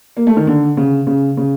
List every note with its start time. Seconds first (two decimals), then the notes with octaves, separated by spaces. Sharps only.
0.17 A#3
0.27 A3
0.37 D#3
0.47 D3
0.77 C#3
1.07 C#3
1.37 C#3